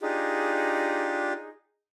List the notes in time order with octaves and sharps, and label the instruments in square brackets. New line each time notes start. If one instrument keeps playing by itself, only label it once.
[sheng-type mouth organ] D4 F4 G4 [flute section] D#4 G#4